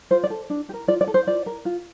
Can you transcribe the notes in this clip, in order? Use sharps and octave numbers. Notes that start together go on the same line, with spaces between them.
F4 C5
D5
A4
D4
G4
A#4
F4 D5
D5
A4
C5
F4 D5
A#4
F4